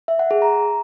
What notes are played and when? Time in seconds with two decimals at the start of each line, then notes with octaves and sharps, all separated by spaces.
0.08 E5
0.19 F#5
0.31 G#4
0.42 A#5